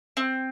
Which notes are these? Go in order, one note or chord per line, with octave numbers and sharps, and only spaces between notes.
C4